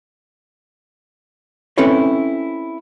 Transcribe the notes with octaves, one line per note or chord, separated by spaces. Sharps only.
C4 C#4 E4 A4 B4 C#5